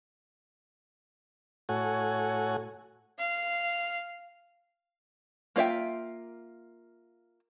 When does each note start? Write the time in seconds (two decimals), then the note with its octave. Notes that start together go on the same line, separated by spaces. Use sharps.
1.69 A2 F#4 A4 C#5 F#5 G#5
3.19 F5
5.56 A#3 F4 C#5 E5 G5